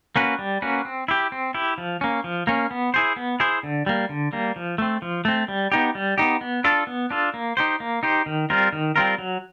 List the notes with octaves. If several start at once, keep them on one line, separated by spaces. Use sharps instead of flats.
A#3 C#4 F#4 B4
G3
A#3 C#4 F#4 B4
C4
E4 G4
C4
E4 G4
F3
A#3 C#4
F3
A#3 C#4
B3
E4 G#4 C5
B3
E4 G#4 C5
D3
G3 A#3
D3
G3 A#3
F3
A3 C4
F3
A3 C4
G3
B3 D#4 G4
G3
B3 D#4 G4
B3
D4 F4 A4
B3
D4 F4 A4
A#3
D#4 G4 C5
A#3
D#4 G4 C5
D#3
G3 C4 F4 A#4
D#3
G3 C4 F4 A#4
F#3